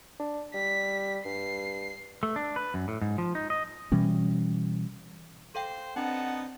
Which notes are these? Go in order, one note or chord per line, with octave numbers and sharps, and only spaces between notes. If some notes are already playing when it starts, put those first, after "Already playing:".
D4
G3 B6
G2 C7
A3
D4
B4
F#2
A2
G#2
F3
D#4
D#5
B2 E3 G3 C#4
A4 C5 F5 G5
B3 C4 D4 D#4 F#5 A5